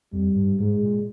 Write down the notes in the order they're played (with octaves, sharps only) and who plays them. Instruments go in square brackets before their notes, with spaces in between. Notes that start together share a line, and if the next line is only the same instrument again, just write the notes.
[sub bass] F2 [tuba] G3
[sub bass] G2
[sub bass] G#2 [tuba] G#3
[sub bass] A#2